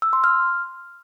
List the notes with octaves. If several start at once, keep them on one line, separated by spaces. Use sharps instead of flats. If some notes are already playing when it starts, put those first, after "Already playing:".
E6
C6
F6